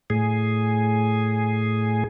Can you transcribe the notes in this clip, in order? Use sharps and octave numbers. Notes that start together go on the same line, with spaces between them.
A2 G#4